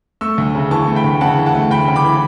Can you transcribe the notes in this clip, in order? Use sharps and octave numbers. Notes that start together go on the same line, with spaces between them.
A3 C#6 E6
D2
C#3
E3 A5 C#6
A3
G5 B5
D2
C#3 F#5 A5
E3
F#5 A5
A3
D2 G5 B5
C#3
B5 D6
E3